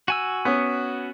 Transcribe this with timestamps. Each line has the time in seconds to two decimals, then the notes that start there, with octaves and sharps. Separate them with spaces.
0.08 F#4 G#5 E6
0.45 B3 C#4